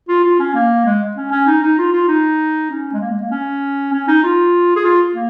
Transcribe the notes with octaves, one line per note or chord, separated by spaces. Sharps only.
F4
F4
C#4
A#3
G#3
C#4
C#4
D#4
D#4
F4
F4
D#4
C#4
G#3
A#3
G#3
A#3
C#4
C#4
D#4
F4
G#4
F4
A#3